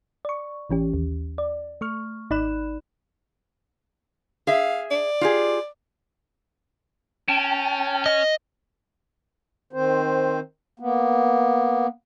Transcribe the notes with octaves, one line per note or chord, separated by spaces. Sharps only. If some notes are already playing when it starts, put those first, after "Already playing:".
D5 C#6
A1 E3 C#4 G4
D#2
D5
A3 C#6 F6
G#1 D#4 D5 B5 F#6 E7
G#4 E5 F5
D5
F4 G4 G#4
C#4 G5 A5
D#5
D#3 C4 C5
A#3 B3